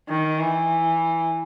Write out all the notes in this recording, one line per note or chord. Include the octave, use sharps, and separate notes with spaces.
D#3
E3